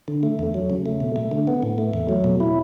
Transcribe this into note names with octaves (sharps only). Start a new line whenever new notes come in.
D3
A3
E2
F#3
C#3
A3
B2
A3
D3
B3
A2
A3
E2
F#3
B2
E4